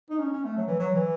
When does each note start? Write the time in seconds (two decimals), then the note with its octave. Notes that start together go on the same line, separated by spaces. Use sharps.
0.10 D#4
0.20 C#4
0.33 C#4
0.45 A3
0.57 F#3
0.68 E3
0.79 F#3
0.94 E3